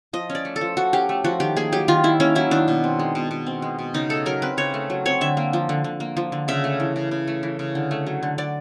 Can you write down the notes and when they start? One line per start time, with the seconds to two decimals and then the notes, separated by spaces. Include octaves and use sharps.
0.13 F3 D#5
0.30 C#4
0.35 D5
0.45 A3
0.56 A4
0.61 F3
0.77 F3 F#4
0.93 C#4 G4
1.09 A3
1.24 F3 F#4
1.40 D#3 G4
1.56 A#3 G#4
1.72 F#3 G4
1.88 D#3 F4
2.04 D#3 E4
2.20 A#3 C#4
2.35 F#3 E4
2.51 D#3 D4
2.68 B2
2.84 C4
2.99 G#3
3.15 B2
3.31 B2
3.47 C4
3.62 G#3
3.79 B2
3.94 C#3 D#4
4.10 A3 A4
4.26 F#3 A#4
4.42 C4 B4
4.57 C#3 C#5
4.74 A3
4.90 F#3
5.05 C4 C#5
5.21 D3 E5
5.37 A#3
5.53 F3
5.69 D3
5.84 D3
6.00 A#3
6.17 F3
6.32 D3
6.48 C#3 E5
6.64 A3
6.80 E3
6.96 C#3
7.11 C#3
7.27 A3
7.43 E3
7.59 C#3
7.75 D3
7.91 A3
8.07 F#3
8.23 D3
8.38 D3 D5